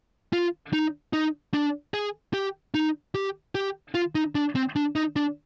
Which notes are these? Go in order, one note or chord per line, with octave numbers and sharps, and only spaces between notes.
F4
D#4
D#4
D4
G#4
G4
D#4
G4
G4
F4
D#4
D4
C4
D4
D#4
D4